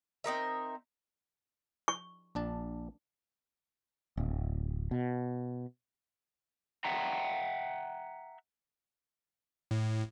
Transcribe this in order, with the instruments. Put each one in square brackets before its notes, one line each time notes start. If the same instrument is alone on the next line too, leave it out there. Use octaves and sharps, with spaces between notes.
[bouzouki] C4 D#4 A#4 E5
[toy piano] C#6
[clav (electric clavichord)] A#1 D4 A5
[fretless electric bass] D1
B2
[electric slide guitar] E5 F#5 G5 A#5
[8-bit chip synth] A2